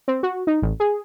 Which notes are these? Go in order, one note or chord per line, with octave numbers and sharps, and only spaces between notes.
C4
F#4
D#4
A1
G#4